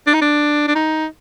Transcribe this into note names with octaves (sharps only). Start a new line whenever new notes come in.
D4
D#4
D4
D4
D#4